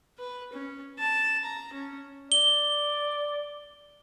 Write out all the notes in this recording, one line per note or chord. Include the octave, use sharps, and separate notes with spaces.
B4
C#4
A5
A#5
C#4
D5 G7